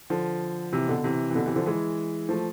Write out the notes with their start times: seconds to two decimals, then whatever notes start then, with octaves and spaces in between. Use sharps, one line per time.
0.10 D3 F3
0.72 C3 E3
0.88 B2 D3
1.04 C3 E3
1.30 E3
1.35 B2 D3
1.46 C3 E3
1.56 D3 F3
1.66 E3 G#3
2.29 F3 A3